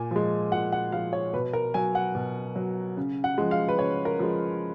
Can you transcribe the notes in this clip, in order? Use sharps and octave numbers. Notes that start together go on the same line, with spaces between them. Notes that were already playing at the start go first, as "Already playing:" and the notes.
Already playing: A#2 G#5
F3 G#3
A#2 F#5
F#5
F3 G#3 F5
C#5
B2 B4
A#4
F#3 G#5
F#5
B2
F#3
C#3
F#5
F3 G#3
F5
B4
C#3 C#5
A#4
F3 G#3